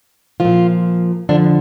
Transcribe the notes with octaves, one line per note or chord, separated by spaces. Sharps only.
A#2 F3 F4
F2 D3 F3 D4